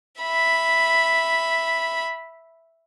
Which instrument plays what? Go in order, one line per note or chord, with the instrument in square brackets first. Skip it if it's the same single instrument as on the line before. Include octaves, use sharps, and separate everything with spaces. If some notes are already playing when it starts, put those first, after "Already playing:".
[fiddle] E5 B5